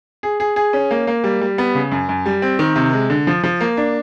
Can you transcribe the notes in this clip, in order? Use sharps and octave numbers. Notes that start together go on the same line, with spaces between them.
G#4
G#4
G#4
C#4
A#3
A#3
G3
G3
B3
C#3
F#2
F#2
G3
C4
D#3
C3
G#3
D3
F3
F3
A#3
D4